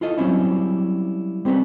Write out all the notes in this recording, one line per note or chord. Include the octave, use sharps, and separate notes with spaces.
E4 F4 A4 D#5
F#3 G3 A#3 C4 C#4 E4
G3 C4 C#4 G4 B4